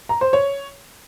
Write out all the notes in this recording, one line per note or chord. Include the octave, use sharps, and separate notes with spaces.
A#5
C5
C#5